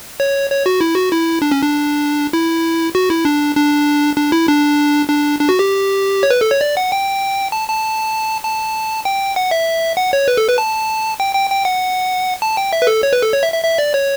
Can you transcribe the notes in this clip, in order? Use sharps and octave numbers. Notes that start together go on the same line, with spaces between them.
C#5
C#5
F#4
E4
F#4
E4
D4
C#4
D4
E4
F#4
E4
D4
D4
D4
E4
D4
D4
D4
F#4
G4
C#5
B4
A4
C#5
D5
F#5
G5
A5
A5
A5
G5
F#5
E5
F#5
C#5
B4
A4
B4
A5
G5
G5
G5
F#5
A5
G5
E5
B4
A4
C#5
B4
A4
C#5
E5
E5
E5
D5
C#5